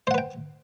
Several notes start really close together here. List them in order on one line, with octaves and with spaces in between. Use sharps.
C5 F#5 B4 G5